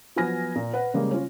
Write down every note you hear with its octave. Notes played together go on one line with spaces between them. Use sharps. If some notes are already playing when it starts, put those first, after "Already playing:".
F3 F#3 B3 G#5 F6 A#6
A#2
B4 F#5
C#3 G3 G#3 A#3
C#4 F4